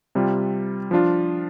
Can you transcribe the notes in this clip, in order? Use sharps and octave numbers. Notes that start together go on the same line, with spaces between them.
C3 G3 F4
F3 D4 F4